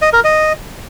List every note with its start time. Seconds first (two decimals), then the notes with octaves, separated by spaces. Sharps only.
0.02 D#5
0.13 A#4
0.24 D#5